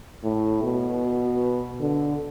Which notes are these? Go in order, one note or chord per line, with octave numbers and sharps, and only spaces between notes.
A2
B2
D3